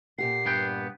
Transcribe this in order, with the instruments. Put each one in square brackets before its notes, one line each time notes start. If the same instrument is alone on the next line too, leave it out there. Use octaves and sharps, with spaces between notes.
[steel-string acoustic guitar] A#2 G4 F#5 [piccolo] C7
[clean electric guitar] G2 B3 G5